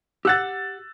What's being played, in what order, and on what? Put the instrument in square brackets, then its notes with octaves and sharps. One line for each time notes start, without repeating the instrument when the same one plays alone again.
[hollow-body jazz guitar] G4 F#5 [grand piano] E6 F#6 A6